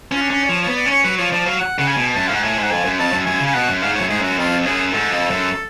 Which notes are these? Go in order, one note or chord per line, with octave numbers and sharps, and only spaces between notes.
C#4 F4
D4
C#4
D5
F3 C#5
B3 C#5
D5
C#4
C#5
F#3 B4
F3 C#5
F3 D5
F#3 F5
F#5
C#3 F#5
G#5
B2
F#2 A5
G#2 F5
F#5
A2 G#5
G#2
F#5
F2 G#5
F#2
F2 A5
F#2
F#2 G#5
C#3
G#5
B2 F#5
F#2
G#2 F5
C#5
F#2
G#2 G#4
F#2 F#4
F2 F4
F#2 G#4
G#2 A4
F2
F#2